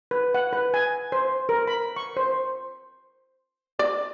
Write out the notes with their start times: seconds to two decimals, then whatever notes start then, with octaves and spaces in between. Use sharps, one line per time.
0.11 B4
0.34 F#5
0.53 B4
0.74 G#5
1.12 C5
1.49 A#4
1.67 B5
1.96 C#6
2.17 C5
3.79 D5